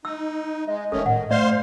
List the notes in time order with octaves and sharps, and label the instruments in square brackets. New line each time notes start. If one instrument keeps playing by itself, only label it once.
[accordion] D#4 [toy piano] E6
[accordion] G#3 [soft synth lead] D#5
[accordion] D#3 A3 C#4 [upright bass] G#3 B3 [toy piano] A4
[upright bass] A2 [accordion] D#3 [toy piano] F#5
[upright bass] G2 [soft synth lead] A3 [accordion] C5 F5 C6 [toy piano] D5